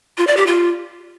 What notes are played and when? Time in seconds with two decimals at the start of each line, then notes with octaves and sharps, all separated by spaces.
0.18 F4
0.27 D5
0.37 G4
0.47 F4